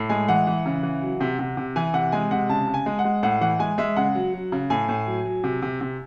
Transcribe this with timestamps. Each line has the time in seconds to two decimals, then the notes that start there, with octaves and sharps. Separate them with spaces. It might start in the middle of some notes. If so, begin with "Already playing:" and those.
Already playing: A2
0.09 G#3 G#5
0.28 E3 F#5
0.47 E3
0.66 C#3
0.83 E3
1.02 F#3
1.21 C3
1.39 C3
1.57 C3
1.76 E3 G#5
1.94 C3 F#5
2.12 G#3 G#5
2.31 C3 F#5
2.49 C#3 A5
2.68 C#3
2.74 G#5
2.86 G#3
2.99 F#5
3.04 G#3
3.23 A2 F#5
3.41 E3 F#5
3.59 G#3 G#5
3.78 G#3 E5
3.96 C#3 F#5
4.15 F#3
4.34 F#3
4.52 C#3
4.70 A2 G#5
4.89 A2
5.07 F#3
5.25 F#3
5.44 C3
5.62 C3
5.81 C3